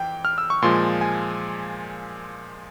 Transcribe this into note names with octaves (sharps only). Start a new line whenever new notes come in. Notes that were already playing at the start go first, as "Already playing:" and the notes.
Already playing: F2 E3 G5
F6
E6
C#6
A#2 F3 G#3 C6
G#5